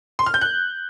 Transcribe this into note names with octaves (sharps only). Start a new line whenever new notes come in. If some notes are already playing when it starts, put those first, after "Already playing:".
C6
F6
G6
F#6